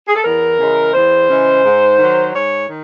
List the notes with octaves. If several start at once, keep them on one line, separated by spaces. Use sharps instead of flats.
G#4
A4
E2 A#4
C#3 E3 G#3
E2 C5
C#3 E3 G#3
G#2
D#3 F#3
G#2 C#5
D#3